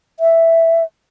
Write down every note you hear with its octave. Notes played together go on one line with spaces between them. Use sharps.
E5